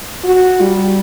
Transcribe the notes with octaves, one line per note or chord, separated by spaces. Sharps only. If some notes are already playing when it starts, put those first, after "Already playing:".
F#4
G3